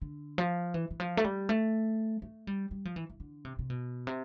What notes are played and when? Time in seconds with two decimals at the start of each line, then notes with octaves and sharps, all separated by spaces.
0.02 D3
0.38 F3
0.74 E3
0.90 E3
1.00 F3
1.17 A3
1.24 G3
1.49 A3
2.22 A3
2.47 G3
2.71 G3
2.85 F3
2.96 E3
3.10 E3
3.20 D3
3.45 C3
3.59 C3
3.70 B2
4.07 C3